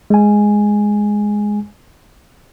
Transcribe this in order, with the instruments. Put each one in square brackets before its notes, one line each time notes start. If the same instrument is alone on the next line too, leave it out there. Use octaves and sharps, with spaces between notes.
[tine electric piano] G#3 G#5